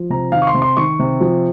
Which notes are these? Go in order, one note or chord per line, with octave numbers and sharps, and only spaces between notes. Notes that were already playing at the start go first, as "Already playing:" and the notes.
Already playing: F3
C3 A#5
D#3 F5
C#6
C6
C3
C6
D#3 C#6
C3
F3